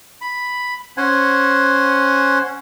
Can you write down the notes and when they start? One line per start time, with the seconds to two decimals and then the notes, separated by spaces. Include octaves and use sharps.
0.21 B5
0.97 C#4 C5 F#5 G#5